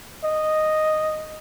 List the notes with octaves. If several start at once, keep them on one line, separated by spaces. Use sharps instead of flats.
D#5